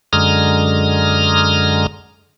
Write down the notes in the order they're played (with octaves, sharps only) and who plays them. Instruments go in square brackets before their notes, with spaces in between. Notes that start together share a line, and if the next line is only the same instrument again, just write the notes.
[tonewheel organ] F#2 D3 G#3 A#5 D#6 F6